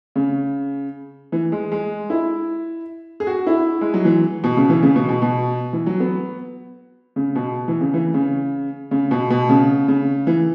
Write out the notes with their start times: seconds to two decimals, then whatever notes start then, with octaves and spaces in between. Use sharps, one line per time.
0.16 C#3
1.32 E3
1.52 G#3
1.72 G#3
2.10 E4
3.20 G#4
3.27 F#4
3.47 E4
3.81 G#3
3.94 F#3
4.05 E3
4.44 B2
4.57 C#3
4.70 E3
4.83 C#3
4.96 B2
5.09 B2
5.22 B2
5.73 E3
5.86 F#3
6.00 B3
7.16 C#3
7.36 B2
7.68 E3
7.81 C#3
7.94 E3
8.14 C#3
8.91 C#3
9.11 B2
9.30 B2
9.49 C#3
9.88 C#3
10.27 E3